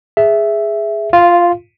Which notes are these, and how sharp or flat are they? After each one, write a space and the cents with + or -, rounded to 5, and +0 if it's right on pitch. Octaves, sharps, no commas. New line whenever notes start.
G#4 +0 E5 +0
F4 +0 F5 -30